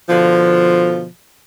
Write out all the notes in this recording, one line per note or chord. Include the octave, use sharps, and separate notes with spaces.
B2 D3 F3